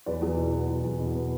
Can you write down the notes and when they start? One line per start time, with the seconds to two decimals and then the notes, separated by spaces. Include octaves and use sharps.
0.06 E2 B4 D5
0.22 E2
0.37 B2
0.53 B3
0.69 E2
0.84 E2
0.99 B2
1.15 B3